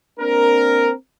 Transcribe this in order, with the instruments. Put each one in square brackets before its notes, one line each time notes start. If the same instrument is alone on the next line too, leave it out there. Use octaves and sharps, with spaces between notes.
[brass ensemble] A#3 C4 D4 A#4